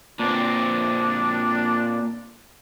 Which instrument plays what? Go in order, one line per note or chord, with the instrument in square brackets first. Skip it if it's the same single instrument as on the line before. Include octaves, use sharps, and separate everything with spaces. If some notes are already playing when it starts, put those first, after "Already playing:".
[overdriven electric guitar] A#2 C4 [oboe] D4